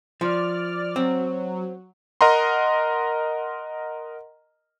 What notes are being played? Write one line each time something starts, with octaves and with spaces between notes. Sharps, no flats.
F3 D5 F6
F#3 C4
A#4 D#5 F#5 A#5 C6